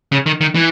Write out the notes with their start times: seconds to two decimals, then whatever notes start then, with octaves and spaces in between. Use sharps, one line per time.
0.12 C#3
0.26 D#3
0.41 D#3
0.55 E3